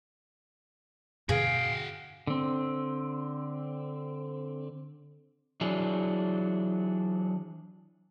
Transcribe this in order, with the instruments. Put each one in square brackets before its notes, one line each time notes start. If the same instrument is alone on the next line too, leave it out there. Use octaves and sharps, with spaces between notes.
[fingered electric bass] G2 B2 D3 [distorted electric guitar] F#4 G5 [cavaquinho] G#4 [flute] F5
[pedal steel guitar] D3 C4
[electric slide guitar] E3 F#3 D4 G#4